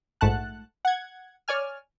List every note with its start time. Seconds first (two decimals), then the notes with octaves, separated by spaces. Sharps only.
0.21 A#1 G#2 A3 F#5 A5 F#6
0.85 F#5 G#6
1.48 C#5 D5 G#5 F6